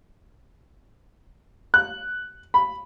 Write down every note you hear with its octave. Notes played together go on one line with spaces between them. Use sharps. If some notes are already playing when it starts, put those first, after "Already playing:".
F#6
B5